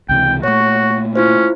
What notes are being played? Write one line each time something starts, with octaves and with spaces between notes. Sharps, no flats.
C#2 C3 E3 G5
A#2 A3 F#4 C#5 C#6
C#4 E4 F4 C5